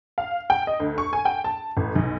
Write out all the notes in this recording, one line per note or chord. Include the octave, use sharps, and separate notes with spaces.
F5
G5
D#5
D2
C#6
G#5
G5
A5
A1
B1